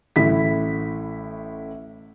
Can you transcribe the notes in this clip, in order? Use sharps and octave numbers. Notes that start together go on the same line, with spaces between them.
A1 A2 E4 B6